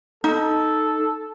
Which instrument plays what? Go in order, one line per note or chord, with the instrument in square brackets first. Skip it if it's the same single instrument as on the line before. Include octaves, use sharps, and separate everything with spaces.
[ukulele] D#4 [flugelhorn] A4